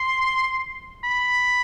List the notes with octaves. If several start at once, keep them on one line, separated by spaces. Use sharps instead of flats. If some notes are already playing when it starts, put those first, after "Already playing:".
Already playing: C6
B5